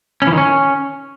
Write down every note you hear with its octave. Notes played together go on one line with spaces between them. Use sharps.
C#4
E3
D#3
C#4